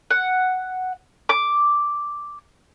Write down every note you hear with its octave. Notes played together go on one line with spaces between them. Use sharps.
F#5
D6